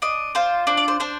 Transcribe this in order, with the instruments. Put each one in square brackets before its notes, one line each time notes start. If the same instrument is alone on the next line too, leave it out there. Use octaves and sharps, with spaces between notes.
[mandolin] D4 D#5
F4 C5
D4 C5
D5
C5
D4 C5